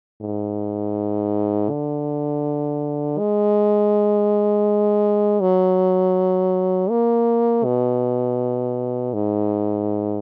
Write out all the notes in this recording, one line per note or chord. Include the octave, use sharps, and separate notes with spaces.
G#2
D3
G#3
F#3
A#3
B2
G#2